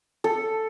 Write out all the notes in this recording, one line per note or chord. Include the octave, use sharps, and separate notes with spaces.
A4